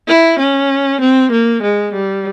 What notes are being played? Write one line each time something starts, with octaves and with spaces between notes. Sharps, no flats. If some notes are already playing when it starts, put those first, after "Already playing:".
E4
C#4
C4
A#3
G#3
G3